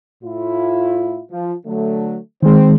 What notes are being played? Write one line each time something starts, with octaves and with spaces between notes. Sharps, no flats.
A2 E4 F4
F3
D3 F#3 A3
D#3 G#3 C4